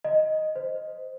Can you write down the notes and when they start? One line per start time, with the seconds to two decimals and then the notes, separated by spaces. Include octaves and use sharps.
0.04 D#5
0.56 C5